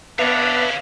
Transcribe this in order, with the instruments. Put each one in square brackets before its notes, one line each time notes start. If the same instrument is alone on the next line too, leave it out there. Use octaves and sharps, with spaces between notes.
[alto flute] B3 [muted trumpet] D4 [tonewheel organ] B4 E5 [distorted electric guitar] C#5 F5